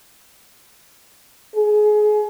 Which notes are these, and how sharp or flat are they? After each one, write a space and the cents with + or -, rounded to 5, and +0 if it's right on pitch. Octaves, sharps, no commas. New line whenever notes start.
G#4 +25